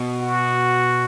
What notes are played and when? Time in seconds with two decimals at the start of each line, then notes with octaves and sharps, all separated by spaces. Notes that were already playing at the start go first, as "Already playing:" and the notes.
Already playing: B2
0.22 F#4